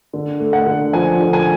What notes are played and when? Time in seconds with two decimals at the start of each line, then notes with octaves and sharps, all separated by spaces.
0.13 D3
0.40 A3
0.53 F#5
0.66 D3
0.93 F3 G#5
1.20 D3
1.33 G#5